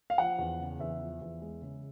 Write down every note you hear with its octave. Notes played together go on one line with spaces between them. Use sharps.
F5
F3 F#5
E2
C#3
E2 E5
F3
E2
G#3
C#3